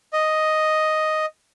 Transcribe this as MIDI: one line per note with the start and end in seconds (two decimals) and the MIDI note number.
0.13 1.26 75